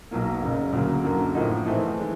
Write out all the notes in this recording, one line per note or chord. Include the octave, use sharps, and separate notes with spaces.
B1 B2 F#3 A#3
F#1 F#2 C#3
D2 C#3 F#3 A#3
F#2 D3 F#3 A#3
A2 F3 A#3 D#4
G#2 E3 A3 C4
E3 G#3